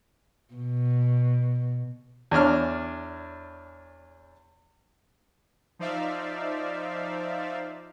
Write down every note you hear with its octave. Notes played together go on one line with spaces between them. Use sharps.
B2
E2 C#4 D4 F6
F3 D#4 C5 D5 E5 F5